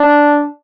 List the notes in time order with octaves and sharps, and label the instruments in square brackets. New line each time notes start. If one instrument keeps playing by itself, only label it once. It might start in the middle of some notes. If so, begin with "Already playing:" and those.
Already playing: [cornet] D4